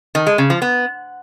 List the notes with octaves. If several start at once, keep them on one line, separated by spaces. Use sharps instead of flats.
D#3
G#3
C#3
F3
B3